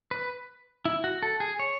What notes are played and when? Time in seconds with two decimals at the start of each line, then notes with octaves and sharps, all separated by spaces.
0.11 B4
0.85 E4
1.04 F#4
1.23 A4
1.40 G#4
1.59 C#5